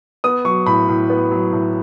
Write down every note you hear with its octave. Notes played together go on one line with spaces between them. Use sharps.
B3 D#6
F#3 C#6
A2 B5
A2
B3
F#3
A2